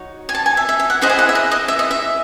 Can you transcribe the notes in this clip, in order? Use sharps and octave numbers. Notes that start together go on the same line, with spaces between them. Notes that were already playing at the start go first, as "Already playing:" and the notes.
Already playing: D#4 F#4 C#5
G#5
A5
G#5
E5
E5
E5
F#5
E4 G#4 C5 D#5 F#5
G#5
F#5
E5
D#5
D#5
E5
D#5
E5